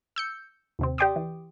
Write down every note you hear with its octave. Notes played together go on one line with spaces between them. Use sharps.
E6 G6 C#7
D#2 C3 C4
G4 D5 G5 C6 D6 D#6
E3